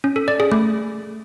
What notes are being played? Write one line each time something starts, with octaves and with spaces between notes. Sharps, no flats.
C#4
A4
D5
G#4
A3